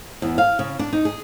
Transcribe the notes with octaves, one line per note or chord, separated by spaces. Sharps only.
E2
F5
C#3
D4
D#4
G#4